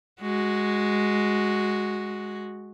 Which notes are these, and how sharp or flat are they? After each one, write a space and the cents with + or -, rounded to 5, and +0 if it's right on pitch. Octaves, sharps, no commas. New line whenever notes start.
G#3 +0 F#4 +0